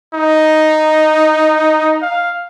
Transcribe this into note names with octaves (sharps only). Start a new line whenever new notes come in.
D#4
F5